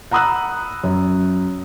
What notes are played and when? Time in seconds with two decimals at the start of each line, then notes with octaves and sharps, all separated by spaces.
0.11 F#5 A#5 B5 D#6 E6 F#6
0.84 F#2